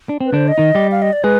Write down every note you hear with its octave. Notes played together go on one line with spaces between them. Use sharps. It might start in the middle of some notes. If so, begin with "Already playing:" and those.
D4
C4
B4
D3 D4 C5
D#5
D#3 D#4
G3 G4
F5
D#5
D5
G#3 G#4 B4